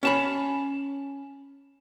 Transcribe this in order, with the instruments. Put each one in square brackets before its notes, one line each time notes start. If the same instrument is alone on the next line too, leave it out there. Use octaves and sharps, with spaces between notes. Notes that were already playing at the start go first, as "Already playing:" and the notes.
[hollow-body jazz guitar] C#4 A5 B5